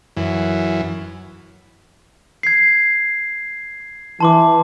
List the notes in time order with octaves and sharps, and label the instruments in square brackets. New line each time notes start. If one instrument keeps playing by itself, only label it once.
[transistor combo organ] F#2 E3
[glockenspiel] G#6 C7
[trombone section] E3 [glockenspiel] A5 C6 D6